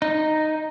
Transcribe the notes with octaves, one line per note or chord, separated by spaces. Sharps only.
D#4